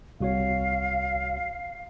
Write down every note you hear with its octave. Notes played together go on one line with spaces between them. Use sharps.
C2 F#4 C#5 F5